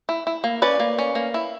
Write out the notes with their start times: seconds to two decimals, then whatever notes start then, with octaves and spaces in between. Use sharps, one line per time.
0.09 E4
0.27 E4
0.44 A#3
0.62 C#4 B4 D5
0.80 A#3
0.99 C#4
1.15 A#3
1.34 E4